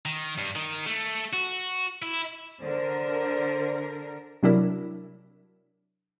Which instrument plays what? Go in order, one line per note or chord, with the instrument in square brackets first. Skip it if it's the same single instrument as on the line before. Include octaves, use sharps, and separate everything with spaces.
[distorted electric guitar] D#3
G2
D#3
A3
F#4
E4
[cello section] D3 A#4 [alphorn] C5
[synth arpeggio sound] C3 F#3 D4 E4 A#4